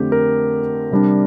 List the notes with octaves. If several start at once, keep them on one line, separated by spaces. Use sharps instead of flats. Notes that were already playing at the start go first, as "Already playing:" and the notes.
Already playing: F2 D3 A3 C4 G4
A#4
C3 G3 D4